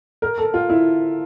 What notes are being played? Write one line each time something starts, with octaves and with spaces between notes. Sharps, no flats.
A#4
A4
F4
E4